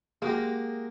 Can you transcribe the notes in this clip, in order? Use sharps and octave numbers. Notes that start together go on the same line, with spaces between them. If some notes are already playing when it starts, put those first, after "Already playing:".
G#3 A#3 F#4 G4